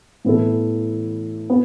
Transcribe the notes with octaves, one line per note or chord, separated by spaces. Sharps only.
A2 E3 B3 E4 A4
B3